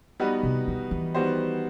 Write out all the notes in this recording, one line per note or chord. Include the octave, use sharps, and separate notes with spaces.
G3 B3 D#4 F#4 B4
C3
E3
E3
D#3 G3 B3 F#4 C5